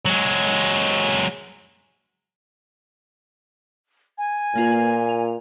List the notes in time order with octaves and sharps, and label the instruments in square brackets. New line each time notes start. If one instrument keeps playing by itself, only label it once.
[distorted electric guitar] F#3 G#3
[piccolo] G#5
[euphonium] A#2 [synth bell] A#3 F4 B4
[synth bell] F7